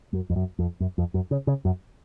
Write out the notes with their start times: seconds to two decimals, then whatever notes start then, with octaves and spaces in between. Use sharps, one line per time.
0.13 F#2
0.30 F2
0.36 F#2
0.59 F2
0.80 F#2
0.98 F2
1.14 F#2
1.31 C#3
1.47 C#3
1.65 F#2